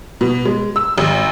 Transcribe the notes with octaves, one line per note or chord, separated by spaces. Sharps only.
B2
G#3
E6
G#1